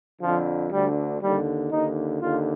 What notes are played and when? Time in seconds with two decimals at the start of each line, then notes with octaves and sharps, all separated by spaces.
0.21 F2 D3 F3
0.71 D2 D3 G3
1.22 D#2 D3 G3
1.71 D#2 D3 D#4
2.20 D#2 D3 F4